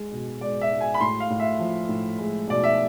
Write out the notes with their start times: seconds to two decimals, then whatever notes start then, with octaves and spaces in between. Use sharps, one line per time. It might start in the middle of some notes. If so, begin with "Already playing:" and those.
Already playing: G#3
0.12 B2
0.41 G#3 D5
0.61 E5
0.71 G#3
0.81 G#5
0.94 B5
1.01 A2 C6
1.20 F5
1.30 A2
1.40 E5
1.60 F3
1.89 A2
2.19 G#3
2.48 B2 D5
2.64 E5